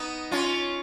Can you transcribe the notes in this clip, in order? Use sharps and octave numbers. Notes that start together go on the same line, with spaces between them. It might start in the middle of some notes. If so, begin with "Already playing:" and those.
Already playing: B3 D#4
C#4 F4